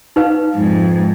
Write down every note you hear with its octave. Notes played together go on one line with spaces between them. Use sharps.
D#4 B4 F5
F2 G#2